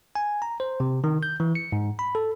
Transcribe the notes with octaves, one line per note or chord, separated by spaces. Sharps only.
G#5
A#5
C5
C3
D#3
G6
E3
C#7
G#2
B5
A4